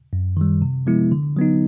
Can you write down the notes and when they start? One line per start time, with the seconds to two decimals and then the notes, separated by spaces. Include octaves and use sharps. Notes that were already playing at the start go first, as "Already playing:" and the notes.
0.13 F#2
0.37 D#3 G3
0.62 C3
0.87 F3 G#3 B3 E4
1.12 D3
1.37 F#3 B3 D#4